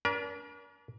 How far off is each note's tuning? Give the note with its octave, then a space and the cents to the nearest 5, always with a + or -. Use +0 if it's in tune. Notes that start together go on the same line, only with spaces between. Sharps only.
D4 -40 A#4 +35